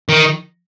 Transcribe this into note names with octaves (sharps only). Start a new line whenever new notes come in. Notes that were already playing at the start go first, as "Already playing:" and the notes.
D#3